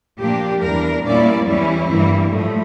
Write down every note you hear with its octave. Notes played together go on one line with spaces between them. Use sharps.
A#2 F3 A#3 D4 G4
E2 E3 G3 D4 A#4
A#2 G3 A#3 C#4 E4 D5
E2 E3 G3 C#4 E4
G2 E3 G3 A#3
A2 F3 A3